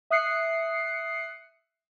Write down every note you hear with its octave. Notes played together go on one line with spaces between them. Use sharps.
E5 D#6 F#6 C7 C#7